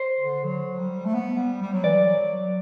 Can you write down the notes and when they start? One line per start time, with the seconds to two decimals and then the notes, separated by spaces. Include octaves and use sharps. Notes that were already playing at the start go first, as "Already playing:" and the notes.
Already playing: C5
0.20 D3
0.44 F#3
0.79 G3
1.05 A3
1.14 B3
1.38 G3
1.61 G3
1.73 F#3
1.84 E3 D5
1.96 F#3